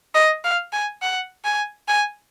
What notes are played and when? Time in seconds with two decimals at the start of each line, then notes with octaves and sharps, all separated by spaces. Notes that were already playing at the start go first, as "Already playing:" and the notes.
0.15 D#5
0.44 F5
0.73 G#5
1.02 F#5
1.45 G#5
1.88 G#5